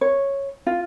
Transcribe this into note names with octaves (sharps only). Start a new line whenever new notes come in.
C#5
F4